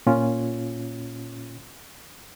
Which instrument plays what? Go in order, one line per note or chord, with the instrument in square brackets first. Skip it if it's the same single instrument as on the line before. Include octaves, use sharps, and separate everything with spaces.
[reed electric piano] A#2 C#4 F4